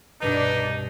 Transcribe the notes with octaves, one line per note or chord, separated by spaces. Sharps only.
C2 G2 B2 D4 D#4 B4